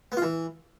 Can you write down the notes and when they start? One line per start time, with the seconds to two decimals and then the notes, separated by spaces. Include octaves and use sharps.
0.12 B3
0.17 F4
0.22 E3